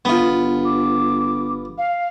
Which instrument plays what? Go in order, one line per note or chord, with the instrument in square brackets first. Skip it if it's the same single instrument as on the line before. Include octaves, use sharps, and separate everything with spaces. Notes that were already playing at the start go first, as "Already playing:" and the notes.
[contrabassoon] G1 [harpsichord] B3 F4
[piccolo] D6
F5